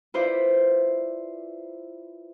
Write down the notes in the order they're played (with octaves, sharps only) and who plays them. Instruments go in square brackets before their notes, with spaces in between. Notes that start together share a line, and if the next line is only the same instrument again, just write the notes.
[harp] E4 F4 B4 C5 D5 E5